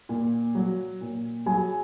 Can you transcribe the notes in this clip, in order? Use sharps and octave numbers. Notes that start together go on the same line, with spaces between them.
A#2
F#3
A#2
F#3 G#4 G#5